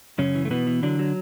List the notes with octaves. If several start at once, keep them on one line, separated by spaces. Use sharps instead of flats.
F#2 C#3 C#4
E3
A3
B2 E3 B3
E3
D3 F#3 D4
F#3